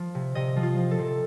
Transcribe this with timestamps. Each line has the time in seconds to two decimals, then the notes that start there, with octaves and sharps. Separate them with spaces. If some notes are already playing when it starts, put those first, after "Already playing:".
Already playing: F3
0.15 C3
0.35 C3 D#5
0.56 F3
0.63 F4
0.78 F3
0.91 A4
0.99 C3